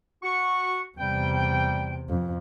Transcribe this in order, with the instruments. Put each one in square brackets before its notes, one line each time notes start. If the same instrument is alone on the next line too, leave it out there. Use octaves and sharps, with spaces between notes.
[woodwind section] F#4 C#6
[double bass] E2 C3 [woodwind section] G3 G5
[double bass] F2